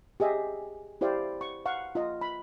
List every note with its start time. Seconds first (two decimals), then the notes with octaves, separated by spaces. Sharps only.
0.20 G4 G#4 D#5 E5
1.01 E4 G4 C5 D5 F5
1.41 C#6
1.66 F5 F#5 C#6
1.95 F4 D#5
2.21 B5